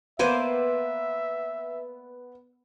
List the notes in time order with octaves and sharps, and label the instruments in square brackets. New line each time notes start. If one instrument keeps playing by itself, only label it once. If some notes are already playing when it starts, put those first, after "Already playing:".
[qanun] A#3 C5 G#5 [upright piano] B3 [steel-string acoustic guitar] B4 D5 F#5 [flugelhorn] E5